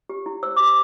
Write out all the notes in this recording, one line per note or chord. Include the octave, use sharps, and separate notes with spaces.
G4
E4
C5 E6
G4 D6